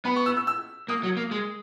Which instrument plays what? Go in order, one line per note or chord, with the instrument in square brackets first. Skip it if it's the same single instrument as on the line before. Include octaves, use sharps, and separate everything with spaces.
[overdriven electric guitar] B3 [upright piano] B5
[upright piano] C#6
E6
E6
E6
[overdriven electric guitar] A#3 [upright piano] D#6
[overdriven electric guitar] F#3
A#3
G#3